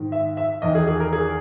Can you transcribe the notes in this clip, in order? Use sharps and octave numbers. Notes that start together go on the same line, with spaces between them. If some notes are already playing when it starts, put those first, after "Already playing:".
Already playing: G#2 D#3
E5
E5
E2 D#3 D#5
G#4
G#4
A#4
G#4